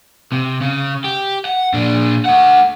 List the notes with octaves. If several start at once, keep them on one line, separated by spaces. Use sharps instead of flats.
C3
C#3
G4
F#5
A#2 D4
A3 F#5